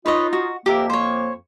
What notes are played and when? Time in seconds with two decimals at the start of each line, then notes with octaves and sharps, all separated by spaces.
0.06 D#4 F4 B4 C#5 D#5
0.33 F#4
0.66 F2 A#3 G4 A#4 E5
0.90 C5 C#5